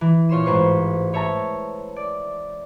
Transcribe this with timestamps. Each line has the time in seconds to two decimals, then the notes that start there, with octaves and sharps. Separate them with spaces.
0.01 E3
0.29 A#2 F4 C#5 C6 E7
0.46 A1 G#2 B4 C5 C#6
1.13 B4 C#5 E5 A5 A#5
1.96 D5